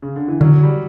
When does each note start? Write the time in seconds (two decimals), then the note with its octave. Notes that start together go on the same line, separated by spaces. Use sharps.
0.02 C#3
0.16 D3
0.28 E3
0.41 D3 F#3
0.63 G3